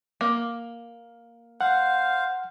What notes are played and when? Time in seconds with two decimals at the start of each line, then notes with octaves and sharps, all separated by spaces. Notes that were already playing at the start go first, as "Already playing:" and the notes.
0.21 A#3
1.61 C5 F5 F#5